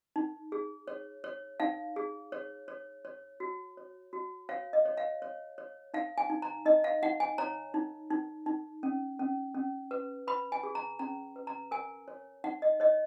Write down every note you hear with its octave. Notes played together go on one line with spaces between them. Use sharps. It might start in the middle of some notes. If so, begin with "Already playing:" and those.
D#4
G#4
C#5
C#5
D#4 F5
G#4
C#5
C#5
C#5
F#4
C#5
F#4
C#5 F5
D#5
C#5
F5
C#5
C#5
D#4 F5
G#5
D#4
A#5
D#4 D#5
F5
D#4 F#5
G#5
C#5 A#5
D#4
D#4
D#4
C#4
C#4
C#4
B4
B4 B5
G#5
G#4
A#5
C#4 A#5
B4
A#5
A#4 G#5
C#5
D#4 F#5
D#5
C#5 D#5